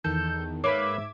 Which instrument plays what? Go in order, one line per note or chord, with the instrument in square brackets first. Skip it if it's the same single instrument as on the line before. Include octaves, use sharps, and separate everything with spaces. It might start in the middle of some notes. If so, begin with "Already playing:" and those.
[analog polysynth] E2 D#3 [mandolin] A4 [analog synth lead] G6
[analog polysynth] G#2 E5 G#6 [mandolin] A#3 B4 B5 [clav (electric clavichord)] C#5 [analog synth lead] D6